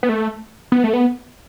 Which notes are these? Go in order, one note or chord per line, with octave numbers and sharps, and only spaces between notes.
B3
A3
B3
A3
B3